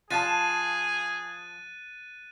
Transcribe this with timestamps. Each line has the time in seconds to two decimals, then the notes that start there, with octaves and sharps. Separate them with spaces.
0.10 F3 G#4 F5 A5 F#6 A6 D#7